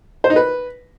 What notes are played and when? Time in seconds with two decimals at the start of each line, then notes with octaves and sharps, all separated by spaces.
0.24 C5
0.30 D#4
0.36 B4